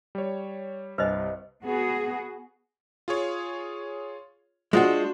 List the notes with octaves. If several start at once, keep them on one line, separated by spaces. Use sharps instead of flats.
G3 C#5
C2 G2 B4 C5 D#5
B3 F#4 G#4
F4 G#4 C#5
G#3 D4 F4 F#4 C5